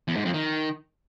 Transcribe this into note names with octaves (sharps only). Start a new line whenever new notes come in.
E2
G#2
F2
D#3